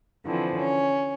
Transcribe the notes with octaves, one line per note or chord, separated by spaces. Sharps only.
D3 E3 F3 C4
C#4